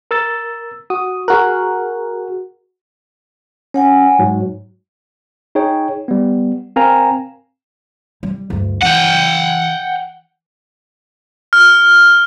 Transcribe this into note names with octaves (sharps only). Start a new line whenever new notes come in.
A#4 E6 A6
F#4 D#6
F#4 G#4 A#4 F#6
C#4 C#5 F#5 G#5
G#2 F#3
D#4 G#4 C#5 G5
G3 B3
C4 A#4 F5 G5 G#5 A#5
G3
D2 G2
E3 F#5 G5
F6